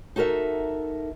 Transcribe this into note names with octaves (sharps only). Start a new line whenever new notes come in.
D#4 F#4 A4 A#4 E5